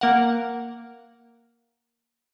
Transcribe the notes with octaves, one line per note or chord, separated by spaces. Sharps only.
A#3 A#4 F5 F#5